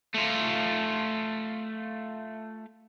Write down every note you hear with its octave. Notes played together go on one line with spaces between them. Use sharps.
A3 F4